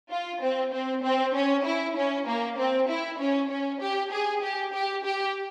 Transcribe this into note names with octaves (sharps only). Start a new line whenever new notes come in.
F4
C4
C4
C4
C#4
E4
C#4
A#3
C4
E4
C#4
C#4
G4
G#4
G4
G4
G4